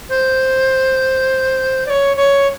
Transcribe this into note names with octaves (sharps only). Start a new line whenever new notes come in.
C5
D5
C#5
C#5